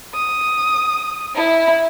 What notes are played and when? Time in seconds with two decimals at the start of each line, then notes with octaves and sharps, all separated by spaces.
0.15 D#6
1.35 E4